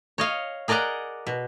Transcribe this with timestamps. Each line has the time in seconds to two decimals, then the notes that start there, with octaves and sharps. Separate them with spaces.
0.18 C#5 D#5 F5
0.68 G#4 A#4 D5 D#5 F#5 A#5
1.27 B2